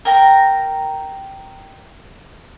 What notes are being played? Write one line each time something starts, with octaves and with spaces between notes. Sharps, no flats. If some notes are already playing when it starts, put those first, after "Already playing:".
A#4 G5 A#5